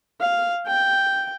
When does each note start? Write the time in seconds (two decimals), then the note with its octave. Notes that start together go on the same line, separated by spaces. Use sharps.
0.21 F5
0.67 G5